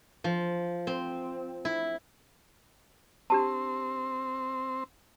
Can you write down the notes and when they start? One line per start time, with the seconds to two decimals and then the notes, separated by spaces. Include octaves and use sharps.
0.24 F3
0.87 C4
1.65 E4
3.30 C4 D4 G4 A5